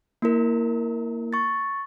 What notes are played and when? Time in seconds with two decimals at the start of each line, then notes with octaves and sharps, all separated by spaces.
0.22 A#3 E4 A#4
1.33 C#6 A6